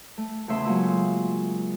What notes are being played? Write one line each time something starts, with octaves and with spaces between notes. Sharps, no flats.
A3
E2 C#3 A3 E5 C6 C#6
F#3 G#3 A#3 F4 E6